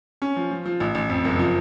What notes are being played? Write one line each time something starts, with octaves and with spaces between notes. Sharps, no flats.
C#4
F3
F3
F3
A1
A1
F2
F#1
F3